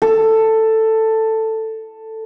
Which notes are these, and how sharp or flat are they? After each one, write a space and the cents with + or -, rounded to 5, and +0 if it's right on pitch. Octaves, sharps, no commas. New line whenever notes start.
A4 +10